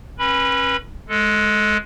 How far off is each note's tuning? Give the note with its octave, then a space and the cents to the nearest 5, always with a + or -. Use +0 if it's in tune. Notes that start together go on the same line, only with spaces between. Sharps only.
C#4 -30 B4 -25 B5 +0
G#3 +15 A4 +0